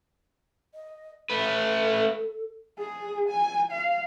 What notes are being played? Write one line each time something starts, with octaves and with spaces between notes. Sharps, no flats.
D#5
A3 A4 B4
G#4
G#5
F5